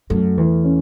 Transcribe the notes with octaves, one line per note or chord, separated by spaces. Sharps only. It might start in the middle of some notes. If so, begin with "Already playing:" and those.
F#2 A3
E2 E3
C#4